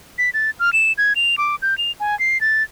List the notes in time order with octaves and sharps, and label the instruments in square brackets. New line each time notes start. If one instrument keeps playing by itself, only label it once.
[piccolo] B6
A6
F6
E7
G#6
F7
D6
G6
F7
G#5
C7
A6